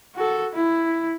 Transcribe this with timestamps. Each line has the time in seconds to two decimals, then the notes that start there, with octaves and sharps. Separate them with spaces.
0.15 F#4 A4
0.53 E4